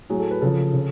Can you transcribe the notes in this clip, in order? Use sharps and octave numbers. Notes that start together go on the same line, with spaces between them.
A2 F#3 G#4
A4
B4
C#3 F3 A4
C#3